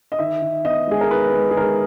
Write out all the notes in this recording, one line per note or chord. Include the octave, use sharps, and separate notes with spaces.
D#5
D#3 E5
D#3
B3 D#5
G#3 G#4
A#4
D#3 B4
G#3
G#4
D#3 A#4